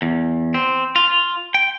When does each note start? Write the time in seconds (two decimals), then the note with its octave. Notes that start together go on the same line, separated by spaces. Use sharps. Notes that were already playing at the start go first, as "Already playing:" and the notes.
0.02 E2
0.54 C4
0.96 F4
1.54 G5